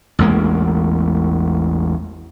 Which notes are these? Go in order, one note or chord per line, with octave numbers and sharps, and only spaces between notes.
A1 E2 G#3 A#3